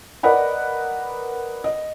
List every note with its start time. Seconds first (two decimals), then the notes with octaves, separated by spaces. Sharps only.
0.23 A#4 B4 D5 D#5 F#5 B5
1.64 D#5